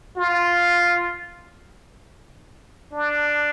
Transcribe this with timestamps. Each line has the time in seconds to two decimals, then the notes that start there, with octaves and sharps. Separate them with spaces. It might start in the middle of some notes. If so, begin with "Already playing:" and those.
0.17 F4
2.93 D4